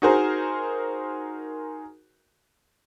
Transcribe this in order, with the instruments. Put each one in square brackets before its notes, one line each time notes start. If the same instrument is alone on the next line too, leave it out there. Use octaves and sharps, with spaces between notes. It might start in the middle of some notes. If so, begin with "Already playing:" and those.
[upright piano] D#4 F#4 G#4 A#4 C5